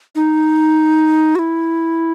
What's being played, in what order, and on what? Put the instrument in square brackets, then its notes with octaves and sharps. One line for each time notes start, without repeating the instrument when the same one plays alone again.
[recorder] D#4
F#4
E4